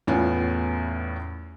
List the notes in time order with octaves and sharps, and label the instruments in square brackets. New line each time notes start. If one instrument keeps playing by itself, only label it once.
[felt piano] E2 A2 B3 C#4 F4 G#5